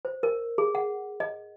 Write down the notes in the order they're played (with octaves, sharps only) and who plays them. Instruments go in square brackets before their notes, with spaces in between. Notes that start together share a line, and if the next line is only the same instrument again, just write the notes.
[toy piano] C5
A#4
G#4
F#5
D#5